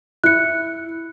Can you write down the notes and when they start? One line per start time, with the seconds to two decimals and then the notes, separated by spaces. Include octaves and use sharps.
0.24 E4 F#6 C#7